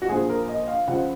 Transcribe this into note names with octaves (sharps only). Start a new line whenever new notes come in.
F#4
A#1 A#2 F3 G#4
A#4
D#5
F5
C#2 C#3 F3 F#5